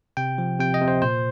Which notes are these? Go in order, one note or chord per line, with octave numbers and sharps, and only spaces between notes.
C3 G5
F3
C3 G5
D#5
C3
C5
A#2 C5